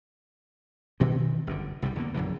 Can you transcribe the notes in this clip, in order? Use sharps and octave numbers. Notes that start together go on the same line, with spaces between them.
G2 B2 D#3 E3
G1 F#2 D3
C2 C3 F#3 G3
E2 D3 F3 A#3
A#1 F#2 D3 E3